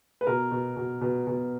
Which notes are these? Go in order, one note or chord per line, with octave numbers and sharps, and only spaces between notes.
B4
B2 A#4
B2
B2
B2
B2